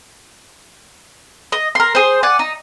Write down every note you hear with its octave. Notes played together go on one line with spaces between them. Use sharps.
D#5
A#4 C6
G#4 C5
D5 F#5 G#5
D#4